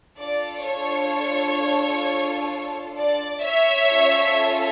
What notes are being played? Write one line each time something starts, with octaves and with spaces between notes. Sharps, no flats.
D4 F4 A4 D5
C#5
D5
C#5 E5
C#4 F4 A4